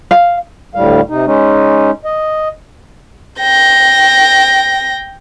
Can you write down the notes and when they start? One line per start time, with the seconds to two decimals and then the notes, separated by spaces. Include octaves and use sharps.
0.11 F5
0.75 D2 A2 G3 F5
1.09 C3 D#4
1.26 G#3 C#4 D#4
2.05 D#5
3.40 G5 A#6